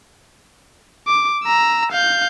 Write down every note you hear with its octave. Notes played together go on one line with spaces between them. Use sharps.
D6
A#5 E6
F5 G6